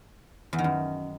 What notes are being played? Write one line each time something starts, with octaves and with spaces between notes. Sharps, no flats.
E2
D#3
F#2